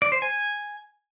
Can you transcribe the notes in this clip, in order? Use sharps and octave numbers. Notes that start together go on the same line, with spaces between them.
D5
C5
G#5